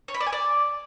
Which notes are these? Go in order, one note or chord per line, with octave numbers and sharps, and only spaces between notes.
C#5
B5
D5
G#5
D5